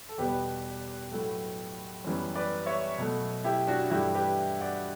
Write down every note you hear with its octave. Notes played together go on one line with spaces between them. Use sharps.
A4
E2 B2 G3 B3 G4 B4
A2 F#3 A3
F#2 E3 G3 B3
B4 D5
C#5 E5
B2 F#3 A3
E4 G4
D4 F#4
G2 E3 A3 E4 G4
G4 B4
D5 F#5